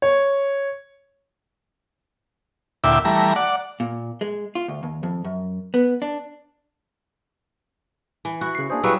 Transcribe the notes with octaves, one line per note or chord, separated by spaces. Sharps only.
C#5
D2 A#2 E4 E5 G5 D6
E3 G3 A3 A#5
D5 F#5
A#2
G#3
F4
D2
D#2
F2
F#2
B3
D4
E3
E4 F#4 F#6
C#3 C7
A#3 D4 G#4 C5
F#3 G3 E4 G#4 B4 F5 C#6 E6